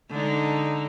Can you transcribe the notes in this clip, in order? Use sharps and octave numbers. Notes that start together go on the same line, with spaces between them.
D3 G#3 D#4